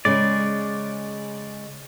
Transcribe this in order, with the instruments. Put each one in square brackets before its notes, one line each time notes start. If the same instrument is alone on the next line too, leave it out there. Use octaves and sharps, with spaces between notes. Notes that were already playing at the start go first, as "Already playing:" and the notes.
[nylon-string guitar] C#3 G#3 [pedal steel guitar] D5